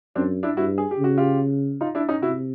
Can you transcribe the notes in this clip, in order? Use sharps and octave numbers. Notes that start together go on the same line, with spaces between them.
F#2 C4 D4
D4 E4
G2 E4 F#4
G#4
G4
C#3
F#4
F4 G4
D#4 F4
D4 E4
C#4 D#4
C3 E4 F#4